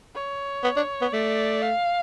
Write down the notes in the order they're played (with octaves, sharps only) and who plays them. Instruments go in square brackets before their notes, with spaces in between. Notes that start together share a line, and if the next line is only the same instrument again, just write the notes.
[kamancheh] C#5
[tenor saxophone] B3
D4
B3
[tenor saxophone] A3 [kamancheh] D5
[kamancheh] F5